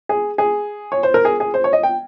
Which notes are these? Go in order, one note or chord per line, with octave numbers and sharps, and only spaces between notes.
G#4
G#4
C#5
C5
A#4
G#4
G#4
C5
C#5
D#5
G5